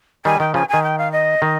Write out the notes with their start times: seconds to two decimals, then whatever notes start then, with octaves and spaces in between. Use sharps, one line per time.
0.25 D#3 G3 G#5
0.40 D#3 G5
0.54 C#3 F3 G#5
0.69 D#3 G#5
0.83 G5
0.98 F5
1.12 D#5
1.42 D#3